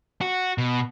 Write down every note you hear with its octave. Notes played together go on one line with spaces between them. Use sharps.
F#4
B2